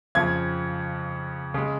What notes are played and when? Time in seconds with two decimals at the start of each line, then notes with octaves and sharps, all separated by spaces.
0.15 F2 C#3 F3 G#6
1.54 C#3 G#3